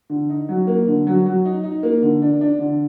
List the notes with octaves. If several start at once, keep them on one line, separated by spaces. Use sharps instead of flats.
D3
D#4
F#3
A#3
D3
F#3
F#3
D#4
D#4
A#3
D3
D4
D4
D3